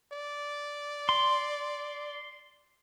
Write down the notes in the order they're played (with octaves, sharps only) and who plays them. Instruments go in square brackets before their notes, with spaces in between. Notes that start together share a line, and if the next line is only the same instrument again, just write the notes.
[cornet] D5
[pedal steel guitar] C6